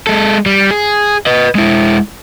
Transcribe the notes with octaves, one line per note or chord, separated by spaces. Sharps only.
G#3 A4
G3
G#4
B4 D#5
G#3 E4